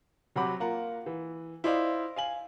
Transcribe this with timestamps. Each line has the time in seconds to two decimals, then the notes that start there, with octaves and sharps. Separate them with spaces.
0.36 C3 F#3 C4 F#5 B5 D6
0.60 A#3 F4 F#5 A#5
1.06 E3
1.64 E4 C5 D5 D#5 F5
2.16 F5 G#5 F#7